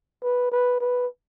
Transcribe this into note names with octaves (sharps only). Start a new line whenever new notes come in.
B4
B4
B4